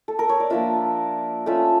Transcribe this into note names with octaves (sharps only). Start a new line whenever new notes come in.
A4
A#4
C#5
D5
F3 A#3 D4 F4 E5
A3 C#4 F4 E5